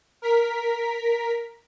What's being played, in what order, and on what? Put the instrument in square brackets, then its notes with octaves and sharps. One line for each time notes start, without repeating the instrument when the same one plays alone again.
[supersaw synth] A#4 B6